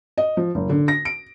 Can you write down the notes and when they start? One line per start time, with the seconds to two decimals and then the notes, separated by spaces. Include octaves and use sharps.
0.18 D#5
0.37 F3
0.55 F#1
0.70 D3
0.88 A#6
1.05 D7